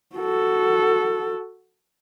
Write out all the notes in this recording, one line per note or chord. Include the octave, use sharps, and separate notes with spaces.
F#4 A4